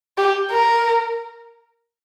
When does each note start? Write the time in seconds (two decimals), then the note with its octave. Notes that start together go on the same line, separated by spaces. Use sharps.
0.18 G4
0.52 A#4